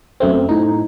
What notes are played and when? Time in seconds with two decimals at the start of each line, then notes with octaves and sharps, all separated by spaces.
0.20 F#2 A3 C4
0.49 A2 D#4